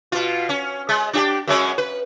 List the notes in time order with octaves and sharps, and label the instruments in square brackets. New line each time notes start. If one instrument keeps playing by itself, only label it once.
[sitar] B2 F4
C#4
G#3
D4 F#4 G4
F#2 G#3 C#4
B4